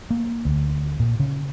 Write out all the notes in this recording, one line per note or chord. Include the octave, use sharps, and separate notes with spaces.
A#3
D2
A#2
C#3